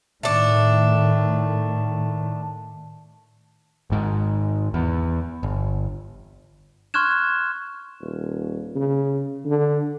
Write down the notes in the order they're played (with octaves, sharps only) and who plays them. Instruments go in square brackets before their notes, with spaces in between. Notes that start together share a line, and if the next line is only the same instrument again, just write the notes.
[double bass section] A2 D#3 [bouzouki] A3 D4
[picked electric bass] G#1 G#2 D#3
E2
G1
[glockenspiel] C6 C#6 F6 F#6 G#6 E7
[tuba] D#1
C#3
D3